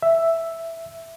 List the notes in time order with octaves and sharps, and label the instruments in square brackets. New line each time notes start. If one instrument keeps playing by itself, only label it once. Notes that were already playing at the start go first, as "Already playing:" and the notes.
[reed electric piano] E5